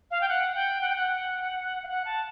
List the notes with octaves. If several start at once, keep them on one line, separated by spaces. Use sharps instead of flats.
F5
G5
F#5
G5
F#5
G5
F#5
F5
F#5
A5